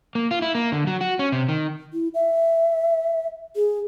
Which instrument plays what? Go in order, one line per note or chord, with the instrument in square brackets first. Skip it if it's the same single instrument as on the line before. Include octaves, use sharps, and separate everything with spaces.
[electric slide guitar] A#3
F4
E4
A#3
D3
F#3
F#4
C#4
C3
D#3
[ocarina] E4
E5
G#4